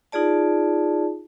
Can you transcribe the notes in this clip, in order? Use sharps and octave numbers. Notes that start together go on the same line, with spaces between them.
D#4 F4 G#4 D5 A5